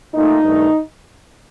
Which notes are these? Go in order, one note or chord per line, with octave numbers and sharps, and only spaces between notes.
A#2 A3 D#4
G2 D#3 A3